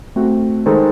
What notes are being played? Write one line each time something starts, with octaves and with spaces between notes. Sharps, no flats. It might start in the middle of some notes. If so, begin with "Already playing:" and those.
A3 C4 F#4
D#3 G#3 D#4 A4 C5